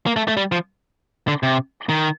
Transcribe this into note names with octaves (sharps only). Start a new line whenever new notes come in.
A#3
A3
A3
G3
F3
D3
C3
D#3